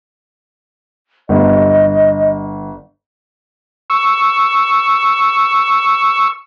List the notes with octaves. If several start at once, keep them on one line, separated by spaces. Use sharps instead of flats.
G1 D#5
C#6 E6